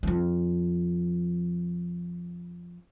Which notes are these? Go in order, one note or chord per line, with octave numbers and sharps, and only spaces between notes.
F2 F3